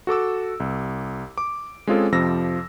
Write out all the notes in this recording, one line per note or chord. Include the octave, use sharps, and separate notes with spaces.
F#4 A4 D6 E6
C2
D6
G#3 C4 C#4 F4 G#4 A4
F2 C3 F3 E6 A#6